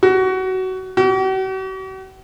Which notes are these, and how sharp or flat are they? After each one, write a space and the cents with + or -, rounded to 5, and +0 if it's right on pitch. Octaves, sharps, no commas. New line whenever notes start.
F#4 +20
F#4 +45